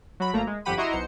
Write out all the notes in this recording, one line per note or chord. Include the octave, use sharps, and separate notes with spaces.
F#3 B5
G#1 A3 A#3 A#5
G#3
G1 F2 G4 F#5 B5 D#7
E4 F#4 D#5 A#5 C6
B1 C5 C#7